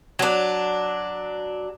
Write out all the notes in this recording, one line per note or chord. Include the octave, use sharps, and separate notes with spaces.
F#3 D4